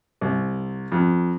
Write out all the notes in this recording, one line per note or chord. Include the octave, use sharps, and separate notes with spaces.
C2
F2